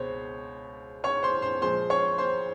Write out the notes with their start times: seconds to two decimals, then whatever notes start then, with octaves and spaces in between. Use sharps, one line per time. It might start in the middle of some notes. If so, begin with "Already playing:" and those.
Already playing: C#2 B2 G#3 C5 C#5
1.04 C#5 C#6
1.23 C5 C6
1.42 C5 C6
1.62 A#2 F3 G#3 C5 C6
1.90 C#5 C#6
2.18 C5 C6